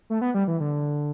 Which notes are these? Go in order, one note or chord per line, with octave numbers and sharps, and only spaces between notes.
A3
B3
G3
E3
D3